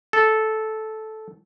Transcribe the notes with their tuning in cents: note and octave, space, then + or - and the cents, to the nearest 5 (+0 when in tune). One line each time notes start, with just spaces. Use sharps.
A4 -10